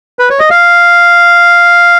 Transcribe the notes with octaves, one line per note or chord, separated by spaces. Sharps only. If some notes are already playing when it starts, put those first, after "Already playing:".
B4
C#5
D#5
F5